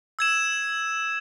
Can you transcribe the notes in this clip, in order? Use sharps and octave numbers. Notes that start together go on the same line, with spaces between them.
E6 G#6 E7